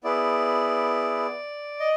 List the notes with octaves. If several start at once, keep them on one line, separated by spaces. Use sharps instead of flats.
B3 E4 G#4 D5
D#5